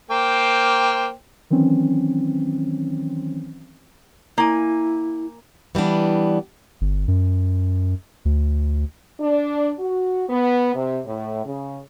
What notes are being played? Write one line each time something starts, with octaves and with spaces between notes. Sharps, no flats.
A#3 C5 G5
D#3 E3 F#3 C4 C#4
A#3 E4 G#5
E3 G3 B3 D4
G1
F#2
D2
D4
F#4
B3
C3
A2
C#3